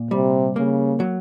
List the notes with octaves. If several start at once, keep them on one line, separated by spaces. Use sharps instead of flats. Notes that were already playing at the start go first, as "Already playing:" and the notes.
Already playing: A#2
C3 G3
C#3 A#3
F#3